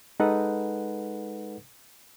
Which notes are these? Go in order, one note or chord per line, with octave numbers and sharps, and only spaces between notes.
G#3 D#4 A4 B4 F#5